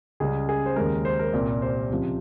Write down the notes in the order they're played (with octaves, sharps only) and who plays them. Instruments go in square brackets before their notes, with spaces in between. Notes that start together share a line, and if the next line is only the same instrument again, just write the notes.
[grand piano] C#2 C#3 G3 G#4
G#4
C5
D#2 C#3 G#3 A#4
C5
A#4
C2 A#2 G3 C4
C5
C#2 C3 F3